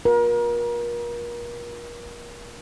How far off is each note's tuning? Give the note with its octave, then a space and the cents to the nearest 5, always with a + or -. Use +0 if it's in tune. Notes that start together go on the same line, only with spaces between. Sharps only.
F4 +45 A#4 +35